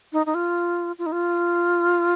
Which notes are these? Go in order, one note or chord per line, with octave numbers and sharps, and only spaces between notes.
D#4
D#4
F4
F4
D#4
F4